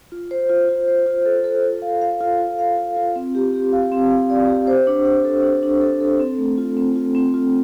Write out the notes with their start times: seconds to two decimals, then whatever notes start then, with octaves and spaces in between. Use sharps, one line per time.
0.12 F4
0.31 C5
0.50 F4
0.69 F4
0.88 C5
1.06 F4
1.26 A4
1.44 A4
1.64 F4
1.82 F5
2.01 F5
2.21 F4
2.40 F4
2.59 F5
2.77 F4
2.97 F4
3.16 C4
3.35 G4
3.54 G4
3.72 F5
3.92 C4
4.10 F5
4.30 D5
4.48 G4
4.67 C5
4.87 D4
5.05 D4
5.25 A4
5.44 D4
5.63 D4
5.81 A4
6.01 A4
6.20 C4
6.38 A3
6.58 F4
6.77 C4
6.96 F4
7.15 C4
7.34 F4